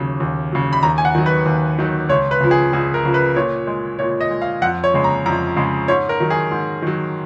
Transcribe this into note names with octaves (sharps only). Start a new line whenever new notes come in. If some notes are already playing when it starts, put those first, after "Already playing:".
Already playing: D#2 C#3 F#3
D#2
C#3 F#3
B5
D#2 A#5
G#5
F#5
D#3 F#3
B4
D#2
D#3 F#3
C#2 C#5
B4
C#3 F3
G#4
C#2 G#4
A#4
C#3 F3
B4
A#2 C#5
G#3
A#2 C#5
D#5
G#3
F5
F2 F#5
C#5
C#3 G#3
A#5
F2 A#5
C#3 G#3
G#2 C#5
A#4
D#3 F#3
G#4
G#2
D#3 F#3